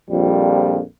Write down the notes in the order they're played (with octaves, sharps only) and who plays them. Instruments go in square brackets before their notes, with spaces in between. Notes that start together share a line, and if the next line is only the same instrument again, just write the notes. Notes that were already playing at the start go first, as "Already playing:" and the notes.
[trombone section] A#1 F2 G3